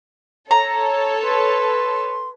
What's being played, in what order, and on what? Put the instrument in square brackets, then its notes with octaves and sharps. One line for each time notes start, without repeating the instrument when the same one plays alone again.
[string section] A4 C#5 [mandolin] A#5
[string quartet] B4 [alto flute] C6